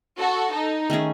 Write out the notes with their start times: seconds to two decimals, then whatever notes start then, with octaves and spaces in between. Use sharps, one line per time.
0.19 F#4 A4
0.54 D#4
0.90 D#3 A3 C#4 G#4